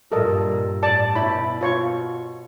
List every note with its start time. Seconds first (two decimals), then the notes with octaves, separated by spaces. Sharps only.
0.12 G2 A#2 A4 A#4 D#5
0.83 A2 D5 A5
1.15 B2 E4 C#5 B5
1.61 F4 C#5 C#6